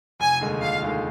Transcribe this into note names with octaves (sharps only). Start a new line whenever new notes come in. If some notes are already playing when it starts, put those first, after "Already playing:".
F1 G#5
D#2 D3 G#3 D#4
F1 F5
D#2 D3 G#3 D#4